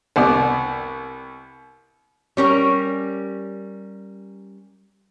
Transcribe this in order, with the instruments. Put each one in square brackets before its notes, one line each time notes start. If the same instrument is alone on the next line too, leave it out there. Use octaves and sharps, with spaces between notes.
[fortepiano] C2 B3 D5
[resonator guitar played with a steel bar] G3 C#4 A#4